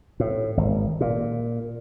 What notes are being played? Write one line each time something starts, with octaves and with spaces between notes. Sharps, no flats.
A2
G#1
A#2